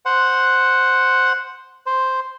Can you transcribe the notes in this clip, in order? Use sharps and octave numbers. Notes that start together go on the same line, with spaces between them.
C5 F#5
C5